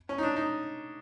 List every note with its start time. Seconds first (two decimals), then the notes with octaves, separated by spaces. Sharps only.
0.09 C#4
0.18 D#4
0.23 D4
0.36 D#4